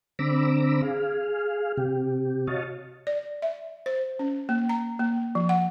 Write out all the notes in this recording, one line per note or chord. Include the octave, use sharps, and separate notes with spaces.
D3 C4 A#5 B5 D6 E6
G#4 F5
C3 G4
F#4 C#5 D#5 F5 A5
D5
E5
C5
C#4
A#3
A#5
A#3
F3
F#5